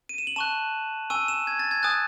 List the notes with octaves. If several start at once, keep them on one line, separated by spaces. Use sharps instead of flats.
D#7
E7
F#7
A5 C#6 F#6 E7
G#5 C#6 E6 D#7
E7
G#6
A6
G#6
G#5 D#6 F#6 A6